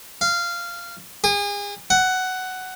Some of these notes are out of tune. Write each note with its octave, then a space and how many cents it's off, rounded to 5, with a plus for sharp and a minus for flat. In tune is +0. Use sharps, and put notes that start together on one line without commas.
F5 -15
G#4 -35
F#5 +10